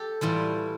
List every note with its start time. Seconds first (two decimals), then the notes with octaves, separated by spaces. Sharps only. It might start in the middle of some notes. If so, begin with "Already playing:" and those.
Already playing: G4 A4
0.21 A2 E3 G3 F4